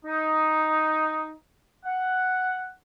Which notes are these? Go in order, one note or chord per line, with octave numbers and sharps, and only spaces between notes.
D#4
F#5